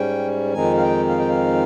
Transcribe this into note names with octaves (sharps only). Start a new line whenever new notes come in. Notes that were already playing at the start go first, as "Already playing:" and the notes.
Already playing: G#2 G3 C#4 G5
F2 D#3 G#3 C4 D#4 G#5
F5
G5
F5
G5
F5